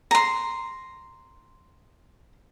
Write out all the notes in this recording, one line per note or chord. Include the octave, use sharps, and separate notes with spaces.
A#5 C6